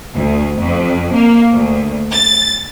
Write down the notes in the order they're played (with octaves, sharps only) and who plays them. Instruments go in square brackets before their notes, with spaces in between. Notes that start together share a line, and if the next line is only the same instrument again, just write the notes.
[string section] D2
F2
A#3
D2
A6